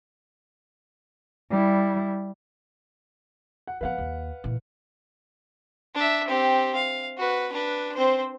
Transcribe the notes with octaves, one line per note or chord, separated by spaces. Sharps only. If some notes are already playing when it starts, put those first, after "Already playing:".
G3 E4
F#5
F3 B3 B4 F5 F#5
D#2
A#2 E3
D4 E5
C4 G4
F5
F#4 B4
D4 B4
C4 C5